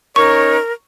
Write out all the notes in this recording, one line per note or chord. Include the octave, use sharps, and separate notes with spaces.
C#4 D#4 A#4 C#5 C#6